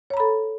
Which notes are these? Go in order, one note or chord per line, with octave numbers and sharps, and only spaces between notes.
A4 C#5 A#5 B5